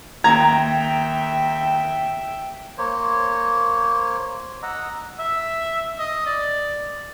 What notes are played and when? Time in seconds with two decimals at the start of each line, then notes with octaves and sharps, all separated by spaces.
0.24 D#2 E5 G5 A#5 G#6
2.78 A#3 C5 C#5
4.63 D#5 F#5 A#5 E6
5.19 E5
5.99 D#5
6.26 D5